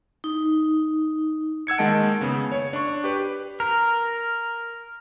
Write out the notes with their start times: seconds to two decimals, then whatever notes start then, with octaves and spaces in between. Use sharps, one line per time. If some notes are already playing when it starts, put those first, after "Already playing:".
0.24 D#4
1.67 F#5 E6 G#6 C#7
1.78 D#3 G#3 A#3 D#5 A5 D7
2.21 C#3 B3
2.52 C#5
2.73 D4 C#6
3.04 G4 B4
3.60 A#4